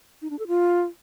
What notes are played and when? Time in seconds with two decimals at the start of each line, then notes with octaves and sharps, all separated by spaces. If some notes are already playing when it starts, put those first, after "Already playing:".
0.22 D#4
0.30 D4
0.39 A4
0.48 F4